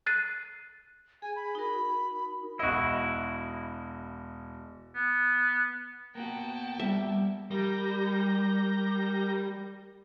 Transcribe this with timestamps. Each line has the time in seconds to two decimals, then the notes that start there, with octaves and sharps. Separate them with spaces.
0.06 F#6 A6 C7 D#7
1.22 G#4 G#5
1.36 B5
1.55 D#4 F#4 A#4
2.59 E1 E4 F#4 D#5
4.95 B3
6.15 A#3 B3 F#4 G5 A5
6.79 G3 E5
7.51 G3 A#4 G6 A#6